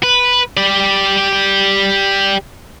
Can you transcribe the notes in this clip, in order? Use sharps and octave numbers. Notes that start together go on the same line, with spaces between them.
B4
G4 D5